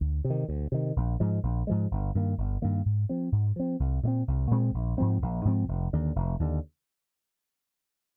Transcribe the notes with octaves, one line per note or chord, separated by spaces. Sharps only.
D2
C3
D#3
D2
C3 D#3
A#1
G#2 F3 G#3
A#1
G#2 F3 G#3
G1
G2 D#3 A#3
G1
G2 D#3 A#3
G#2
F3 C4
G#2
F3 C4
C2
A#2 G#3 C4
C2
A#2 G#3 C4
A#1
G#2 F3 C4
A#1
G#2 F3 C4
F1
D#2 D3
F1
D#2 D3